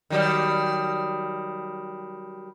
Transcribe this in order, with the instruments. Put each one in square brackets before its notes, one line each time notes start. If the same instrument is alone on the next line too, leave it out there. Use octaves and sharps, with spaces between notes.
[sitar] D#3 F#3 G3